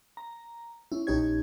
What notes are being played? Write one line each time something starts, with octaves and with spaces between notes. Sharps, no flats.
A#5
C#4 E4
A#1 C#4 D#4 G4 C#5 G#6